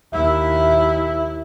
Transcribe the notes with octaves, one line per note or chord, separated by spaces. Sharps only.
D#2 E4 E5